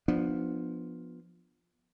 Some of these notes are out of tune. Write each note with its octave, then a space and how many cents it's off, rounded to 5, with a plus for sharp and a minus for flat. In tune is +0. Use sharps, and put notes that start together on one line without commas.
F3 +0 B3 -15 D4 +20